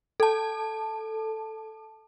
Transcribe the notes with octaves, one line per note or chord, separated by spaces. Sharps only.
A4 A5